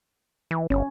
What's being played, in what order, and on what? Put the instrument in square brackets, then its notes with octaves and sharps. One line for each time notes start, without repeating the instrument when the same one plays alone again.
[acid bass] E3
[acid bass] G1 [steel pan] C#4